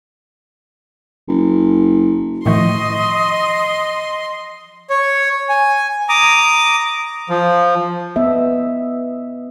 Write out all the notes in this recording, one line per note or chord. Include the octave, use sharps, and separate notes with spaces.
F#1
A2 D#3 F3 A3 D#5 C6 C#6
C#5
G#5
A#5 D6 D#6
F3
B3 D#5 E5